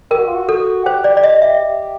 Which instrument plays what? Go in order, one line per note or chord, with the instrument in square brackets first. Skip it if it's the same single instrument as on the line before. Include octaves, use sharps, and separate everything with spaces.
[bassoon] G4 [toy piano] A#4
[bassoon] F#4
F4
F#4
[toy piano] A4
[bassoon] G4 [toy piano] C5
[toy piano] D5
D5
D#5
E5
[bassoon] G4